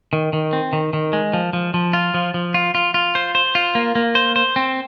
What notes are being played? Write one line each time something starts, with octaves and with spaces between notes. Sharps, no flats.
D#3
D#3
C4
D#3
D#3
G#3
F3
F3
F3
F4
F3
F3
F4
F4
F4
C5
C5
F4
A#3
A#3
C5
C5
C4